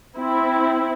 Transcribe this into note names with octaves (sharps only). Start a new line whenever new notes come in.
C4 E4